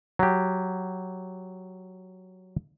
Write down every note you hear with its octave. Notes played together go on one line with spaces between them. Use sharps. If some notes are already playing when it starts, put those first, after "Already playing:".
F#3 G4